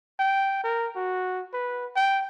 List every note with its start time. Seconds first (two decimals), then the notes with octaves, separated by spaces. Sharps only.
0.19 G5
0.64 A#4
0.96 F#4
1.53 B4
1.96 G5